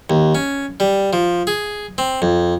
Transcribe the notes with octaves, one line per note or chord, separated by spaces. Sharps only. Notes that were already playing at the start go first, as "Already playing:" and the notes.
D#2
C#4
G3
F3
G#4
C4
F2